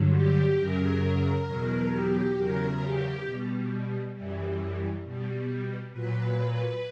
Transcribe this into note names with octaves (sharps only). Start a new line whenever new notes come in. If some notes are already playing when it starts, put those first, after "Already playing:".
Already playing: G2 D3 F#3
G4
F#2 C#3 F#3 A#4
E2 B2 F#3
G4
E2 C#3 F#3 A#4
G4
B2 G3
F#2 E3 G3
B2 G3
A#2 F#3 B4